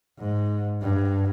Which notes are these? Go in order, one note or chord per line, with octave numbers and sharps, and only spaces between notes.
G#2
G2